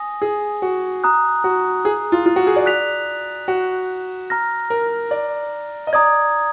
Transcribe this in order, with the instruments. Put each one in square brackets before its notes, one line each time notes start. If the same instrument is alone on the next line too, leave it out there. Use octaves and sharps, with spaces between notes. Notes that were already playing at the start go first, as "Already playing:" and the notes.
Already playing: [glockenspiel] G#5 D#6 A#6
[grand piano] G#4
F#4
[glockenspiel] A#5 D#6 F#6
[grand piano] F#4
G#4
F4
F4
F#4
G#4
D5
[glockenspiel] F#6 B6 F7
[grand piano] F#4
[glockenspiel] A#5 F6 A#6
[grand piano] A#4
D5
D#5
[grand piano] D5 [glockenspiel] A#5 D#6 G#6